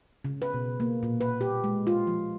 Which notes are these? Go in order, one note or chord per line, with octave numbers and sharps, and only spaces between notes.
C#3
B4
B2
A#3
A#2
B4
G4
G#3
F4
F3